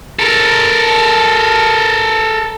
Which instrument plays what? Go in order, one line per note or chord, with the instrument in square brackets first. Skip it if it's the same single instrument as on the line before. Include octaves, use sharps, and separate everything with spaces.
[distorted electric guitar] A4 A#4